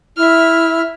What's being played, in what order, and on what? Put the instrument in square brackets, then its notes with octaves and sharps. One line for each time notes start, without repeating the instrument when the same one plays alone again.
[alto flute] E4 [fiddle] E5 F6